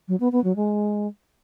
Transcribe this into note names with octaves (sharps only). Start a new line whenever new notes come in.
F#3
B3
B3
F#3
G#3